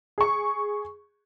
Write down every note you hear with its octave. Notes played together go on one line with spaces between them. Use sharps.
G#4 C#6